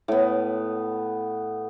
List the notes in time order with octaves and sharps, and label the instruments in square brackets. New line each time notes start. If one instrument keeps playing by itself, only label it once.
[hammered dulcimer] A2 B3